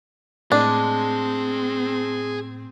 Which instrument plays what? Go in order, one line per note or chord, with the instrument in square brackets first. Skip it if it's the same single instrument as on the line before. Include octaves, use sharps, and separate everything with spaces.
[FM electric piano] A2 [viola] C4 [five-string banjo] D4 [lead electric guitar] G#4 D#5